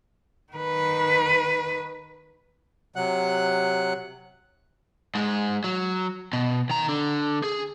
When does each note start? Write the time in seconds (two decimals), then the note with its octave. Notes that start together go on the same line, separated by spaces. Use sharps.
0.53 D#3 B4
2.96 C3 F#3 F#5 F#6
5.15 G#2 G#3
5.64 F#3
6.33 B2
6.70 D#3 A#5
6.88 D3
7.44 G#4